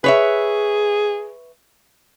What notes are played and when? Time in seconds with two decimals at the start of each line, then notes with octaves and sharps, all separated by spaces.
0.04 G#4 B4 C#5 E5